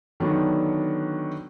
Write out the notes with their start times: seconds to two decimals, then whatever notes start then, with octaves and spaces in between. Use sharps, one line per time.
0.20 D3 D#3 F#3 B3 D4 F#4